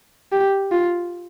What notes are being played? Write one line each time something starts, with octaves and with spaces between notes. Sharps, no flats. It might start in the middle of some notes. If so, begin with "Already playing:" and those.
G4
F4